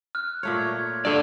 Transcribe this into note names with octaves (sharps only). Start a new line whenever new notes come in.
F6 F#6
A#2 A3 C#5
G#6
G2 A3 A4 D5